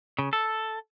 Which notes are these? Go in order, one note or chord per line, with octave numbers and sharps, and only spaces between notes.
C#3
A4